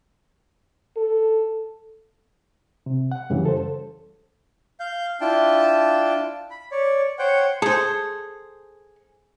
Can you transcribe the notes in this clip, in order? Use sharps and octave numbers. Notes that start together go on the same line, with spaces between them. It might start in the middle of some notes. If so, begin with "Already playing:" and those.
A4
C3
F#5
F#2 C#3 E3 F#3 G3
A4 C5
F5 G6
D4 E4 F4 G5 A5
B5
C#5 D5
C5 C#5 F#5 G5
G#4 A4 C5